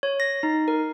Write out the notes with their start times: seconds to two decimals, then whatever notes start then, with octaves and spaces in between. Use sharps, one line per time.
0.03 C#5
0.20 A#6
0.43 D#4
0.68 A#4